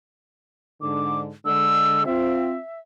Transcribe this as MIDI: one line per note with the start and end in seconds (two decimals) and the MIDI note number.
0.82 1.30 44
0.82 1.30 50
0.82 1.20 86
1.45 2.04 50
1.45 2.04 56
1.45 2.04 88
2.06 2.56 60
2.06 2.56 65
2.06 2.80 76